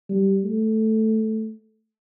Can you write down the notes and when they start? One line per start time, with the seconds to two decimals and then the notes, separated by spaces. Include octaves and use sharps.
0.09 G3
0.44 A3